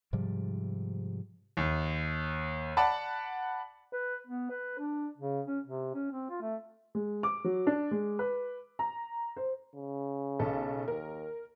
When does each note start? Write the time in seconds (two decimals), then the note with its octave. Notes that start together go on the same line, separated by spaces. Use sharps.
0.13 G#2 C3 F3 G3
1.57 D#2
2.77 D5 F#5 A5 B5
3.93 B4
4.27 B3
4.50 B4
4.78 D4
5.18 C#3
5.47 C#4
5.66 C3
5.94 C#4
6.11 C4
6.30 F4
6.41 A3
6.95 G#3
7.23 D6
7.44 F#3
7.67 D4
7.91 G#3
8.19 B4
8.79 A#5
9.37 C5
9.75 C#3
10.39 B1 A4
10.88 D#2 A#4